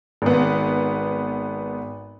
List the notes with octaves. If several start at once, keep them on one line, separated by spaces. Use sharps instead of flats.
G#1 B3